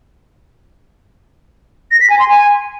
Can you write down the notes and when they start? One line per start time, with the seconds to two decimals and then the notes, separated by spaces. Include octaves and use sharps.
1.91 A#6
2.01 B6
2.10 G#5
2.19 C6
2.28 G#5